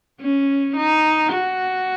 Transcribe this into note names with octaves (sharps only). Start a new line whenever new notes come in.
C#4
D#4
F#4